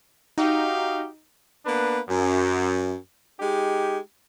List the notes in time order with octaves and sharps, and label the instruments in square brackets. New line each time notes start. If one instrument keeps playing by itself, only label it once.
[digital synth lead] D#4 [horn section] F#4 G4 F5
[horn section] A#3 B3 D4 B4
F#2
G#3 D#4 G4